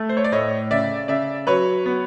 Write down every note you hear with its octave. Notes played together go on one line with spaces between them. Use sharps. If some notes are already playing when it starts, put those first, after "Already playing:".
Already playing: A3
C5
C#5
D5
A2 C#5 D#5
C#3 D5 E5
C#3 D5 E5
F#3 B4 C#5
B3